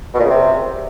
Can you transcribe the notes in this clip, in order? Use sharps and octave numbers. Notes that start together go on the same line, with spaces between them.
B2
A#2
C#3
C3